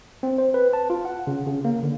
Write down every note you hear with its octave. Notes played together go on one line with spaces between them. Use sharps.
C4
C5
B4
A5
F4
F#5
C#3
C#3
A#3
D3